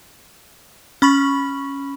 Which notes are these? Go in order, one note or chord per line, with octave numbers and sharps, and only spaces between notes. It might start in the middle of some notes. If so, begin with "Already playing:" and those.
C#4 B5 C#6 F#7